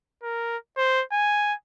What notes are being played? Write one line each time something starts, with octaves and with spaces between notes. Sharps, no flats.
A#4
C5
G#5